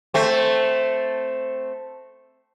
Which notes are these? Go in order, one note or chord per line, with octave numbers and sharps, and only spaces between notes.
A3 C4